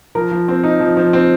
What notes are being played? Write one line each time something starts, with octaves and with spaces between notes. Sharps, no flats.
F3 A#4
F3
C4
D#4
F3
F3
C4